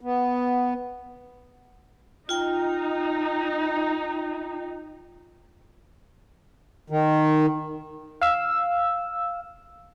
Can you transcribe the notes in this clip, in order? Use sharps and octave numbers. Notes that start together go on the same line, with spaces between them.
B3
D#4 F4 G5
D#3
F5 E6